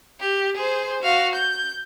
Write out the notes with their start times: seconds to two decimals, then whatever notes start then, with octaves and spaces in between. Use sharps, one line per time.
0.20 G4
0.57 G#4 C5
1.03 F#4 F5
1.35 G6